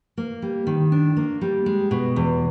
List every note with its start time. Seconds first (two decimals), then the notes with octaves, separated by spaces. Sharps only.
0.18 A#3
0.42 G3
0.67 D#3
0.92 D4
1.17 A#3
1.41 G3
1.66 G#3
1.91 B2
2.16 E2